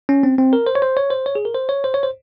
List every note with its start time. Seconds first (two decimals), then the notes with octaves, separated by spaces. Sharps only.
0.09 C#4
0.23 C4
0.38 C4
0.53 A#4
0.67 C5
0.75 C#5
0.82 C5
0.97 C#5
1.10 C5
1.26 C#5
1.35 G#4
1.45 A#4
1.55 C5
1.69 C#5
1.84 C5
1.94 C#5
2.03 C5